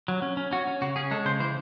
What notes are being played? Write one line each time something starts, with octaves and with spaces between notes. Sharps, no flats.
F#3
C#4
C#4
C#4 F#4
C#4
C#3 F#4
C#4 G#4
G#3 A4
C#3 C5
E3 C5